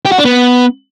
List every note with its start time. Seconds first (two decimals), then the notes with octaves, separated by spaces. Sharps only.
0.05 G4
0.12 F#4
0.18 D4
0.25 B3